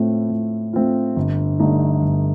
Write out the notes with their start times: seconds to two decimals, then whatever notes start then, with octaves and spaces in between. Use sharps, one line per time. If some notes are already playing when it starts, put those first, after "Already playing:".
Already playing: A2 A3 C4 F4
0.30 A2
0.73 A3 C4 F4
1.16 G1
1.60 G2 D3 A3 D#4
2.03 G1